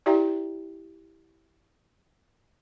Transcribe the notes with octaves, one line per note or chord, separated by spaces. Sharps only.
E4 G4 D5 E5 G5 A#5